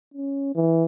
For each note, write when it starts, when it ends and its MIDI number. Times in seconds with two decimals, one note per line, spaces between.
0.14 0.51 61
0.55 0.85 52